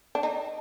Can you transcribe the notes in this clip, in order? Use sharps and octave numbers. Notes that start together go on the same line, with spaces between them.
D4
D#4